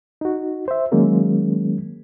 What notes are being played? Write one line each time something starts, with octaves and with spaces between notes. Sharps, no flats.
D#4 F#4
C5 E5
D#3 F#3 G#3 A#3 C#4